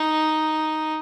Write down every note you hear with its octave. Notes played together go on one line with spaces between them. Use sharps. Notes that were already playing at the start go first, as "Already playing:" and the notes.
Already playing: D#4